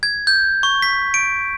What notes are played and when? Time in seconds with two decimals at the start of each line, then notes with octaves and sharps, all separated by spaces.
0.03 G#6
0.27 G6
0.63 C#6
0.82 B6
1.14 D7